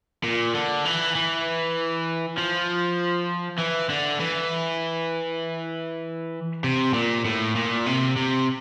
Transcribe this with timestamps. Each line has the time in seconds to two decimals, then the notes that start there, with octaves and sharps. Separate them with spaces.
0.24 A#2
0.55 D3
0.85 E3
1.15 E3
2.37 F3
3.59 E3
3.90 D3
4.20 E3
6.64 C3
6.94 A#2
7.25 A2
7.55 A#2
7.86 C3
8.16 C3